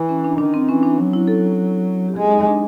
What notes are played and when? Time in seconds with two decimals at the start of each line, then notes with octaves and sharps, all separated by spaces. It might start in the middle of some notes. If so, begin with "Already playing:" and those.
Already playing: E3
0.09 C#4
0.25 D4
0.38 D#3 D4
0.54 C4
0.69 E3 C#4
0.83 D4
0.98 F#3
1.13 E4
1.27 A4
2.08 G4
2.16 G#3 G#4
2.31 D#4
2.47 D4